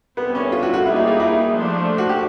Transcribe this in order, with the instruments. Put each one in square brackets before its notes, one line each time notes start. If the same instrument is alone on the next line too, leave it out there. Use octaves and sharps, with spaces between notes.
[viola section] D3 G3 C4 E4 A4 [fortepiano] B3
[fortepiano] C#4
F4
F#4
F#4
[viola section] G3 A#3 D#4 G#4 [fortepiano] E4
[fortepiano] E4
F4
E4
[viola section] F3 A3 D4
[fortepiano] F#4
G4